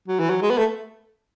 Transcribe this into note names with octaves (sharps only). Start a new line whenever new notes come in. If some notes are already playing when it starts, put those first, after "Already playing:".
F#3
E3
F#3
G#3
B3
A3